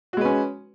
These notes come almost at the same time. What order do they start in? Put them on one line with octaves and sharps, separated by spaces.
F#4 G#3 B4 C#4